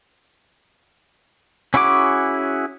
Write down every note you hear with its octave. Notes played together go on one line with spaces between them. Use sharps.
C#4 E4 F#4 G#4 D6